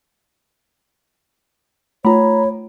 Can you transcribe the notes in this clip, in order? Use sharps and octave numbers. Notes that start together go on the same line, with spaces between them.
A3 F4 C#5 A#5 B5